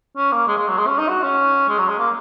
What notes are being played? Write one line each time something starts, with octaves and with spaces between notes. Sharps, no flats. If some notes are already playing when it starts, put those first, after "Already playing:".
C#4
A#3
G#3
G#3
F#3
G#3
C#4
D#4
F#4
C#4
G#3
F#3
G#3
A#3